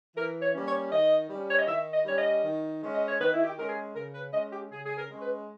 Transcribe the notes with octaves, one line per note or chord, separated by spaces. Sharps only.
E3 A#4
C#5
G3 A#3 C#4
C#5
D#3 D#5
G3 C#4
C#5
D#5
D#3 E5
D#5
G3 C#4 C#5
D#5
D#3
G#3 C#4
D#5
C#5
D#3 B4
E4
G4
G#3 C#4 A#4
G#4
C#3 A#4
B4
G#3 C#4 D#5
G4
C#3 G#4
G#4
A#4
G#3 C#4
B4